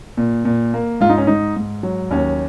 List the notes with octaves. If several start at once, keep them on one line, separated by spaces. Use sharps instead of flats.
A#2
A#2
A#3
G#2 F4
D#4
C#4
G#2 D#4
G#2
F#3
D#2 C#4